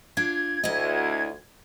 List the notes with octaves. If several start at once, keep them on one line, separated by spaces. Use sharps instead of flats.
D4 F4 G#6
D2 E4 D#5